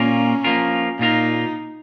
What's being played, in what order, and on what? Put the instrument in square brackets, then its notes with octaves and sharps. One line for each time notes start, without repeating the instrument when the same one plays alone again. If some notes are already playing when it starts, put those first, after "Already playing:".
Already playing: [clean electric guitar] A#2 A#3 F4 A#4 [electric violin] C#4
[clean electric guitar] F3 A#3 F4 A#4
[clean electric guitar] A#2 A#3 F4 A#4 [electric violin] D#4